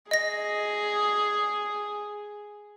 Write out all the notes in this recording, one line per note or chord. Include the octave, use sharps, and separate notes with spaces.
G#4 D#5 A#6